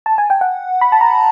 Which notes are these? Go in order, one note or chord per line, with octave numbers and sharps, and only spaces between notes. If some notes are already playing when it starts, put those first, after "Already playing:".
A5
G#5
G5
F#5
B5
A5
A#5